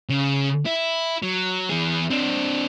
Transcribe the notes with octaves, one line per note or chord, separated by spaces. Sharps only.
C#3
E4
F#3
E3 G#4
C4 D4